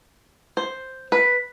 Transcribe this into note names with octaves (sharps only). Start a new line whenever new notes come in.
C5
B4